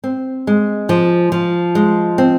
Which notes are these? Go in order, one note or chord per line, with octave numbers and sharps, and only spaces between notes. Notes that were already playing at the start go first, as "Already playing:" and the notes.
C4
G#3
F3
F3
G#3
C4